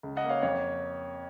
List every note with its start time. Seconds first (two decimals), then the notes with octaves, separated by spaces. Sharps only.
0.03 C#2
0.17 D#5 F#5
0.24 A#3
0.29 C#5 F5
0.43 F2 C#5